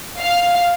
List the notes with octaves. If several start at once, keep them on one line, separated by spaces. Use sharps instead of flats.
F5